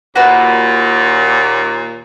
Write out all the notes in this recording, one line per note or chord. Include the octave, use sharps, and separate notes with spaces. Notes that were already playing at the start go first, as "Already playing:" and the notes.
D#2 A#2 F#4 B4